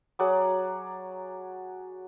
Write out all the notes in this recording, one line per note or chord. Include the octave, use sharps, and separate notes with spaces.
F#3 G#4 D5 F#5